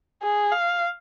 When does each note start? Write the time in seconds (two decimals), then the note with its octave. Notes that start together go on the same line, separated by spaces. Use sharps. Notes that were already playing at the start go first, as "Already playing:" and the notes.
0.23 G#4
0.52 F5